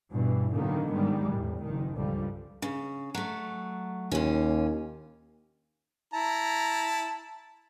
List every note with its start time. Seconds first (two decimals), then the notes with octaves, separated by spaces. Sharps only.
0.11 G2 B2 E3
0.55 A2 D3 D#3 F#3 A#3 B3
0.92 G#2 D#3 G3 G#3
1.33 E2 A2
1.63 F#1 D#3
1.96 C#2 G2 D3 F3 G3
2.62 C#3
3.15 F#3 A3
4.11 D#2 A#2 C#4
6.13 E4 A5 A#5